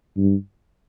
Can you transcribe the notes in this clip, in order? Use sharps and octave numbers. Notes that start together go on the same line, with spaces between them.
G2